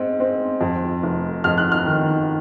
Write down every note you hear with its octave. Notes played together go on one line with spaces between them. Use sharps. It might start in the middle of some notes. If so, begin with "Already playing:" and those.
Already playing: G#2 C4
C4
F2
F1
F2 F6
F#6
F6
D#3